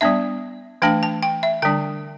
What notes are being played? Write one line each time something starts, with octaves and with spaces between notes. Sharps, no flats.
G3 B3 D4 E5
E3 A3 D4 G5
A5
G5
E5
D3 G3 D4 G5